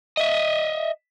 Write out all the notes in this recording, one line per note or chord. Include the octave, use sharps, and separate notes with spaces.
D#5 E5